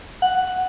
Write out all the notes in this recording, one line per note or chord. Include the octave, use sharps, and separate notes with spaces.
F#5